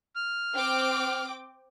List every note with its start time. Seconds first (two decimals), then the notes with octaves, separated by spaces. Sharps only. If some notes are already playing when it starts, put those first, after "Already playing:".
0.16 F6
0.54 C4 G5 D6